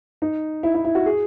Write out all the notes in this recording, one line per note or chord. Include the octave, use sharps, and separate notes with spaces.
D#4
E4
E4
E4
F#4
G#4